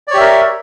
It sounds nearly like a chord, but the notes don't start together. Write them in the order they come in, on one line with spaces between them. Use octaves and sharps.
D5 C#5 G4 E5 A#4